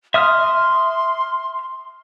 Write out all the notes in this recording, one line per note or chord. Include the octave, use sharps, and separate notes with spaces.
E5 C6 D#6 F6